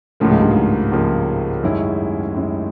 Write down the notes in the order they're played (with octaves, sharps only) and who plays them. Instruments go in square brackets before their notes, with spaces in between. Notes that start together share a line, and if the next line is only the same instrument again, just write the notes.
[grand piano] C#2 C#3 F3 A#3 [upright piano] A2
[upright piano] G#2
G2
G#2
[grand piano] C#2 C#3 F3 A#3
F#2 D#3 G#3 C#4 E4
F#2 D#3 G#3 C#4 E4